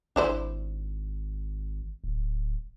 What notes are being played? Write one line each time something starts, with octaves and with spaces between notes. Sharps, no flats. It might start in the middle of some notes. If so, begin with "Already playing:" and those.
G#1 D4 E4 C5
D1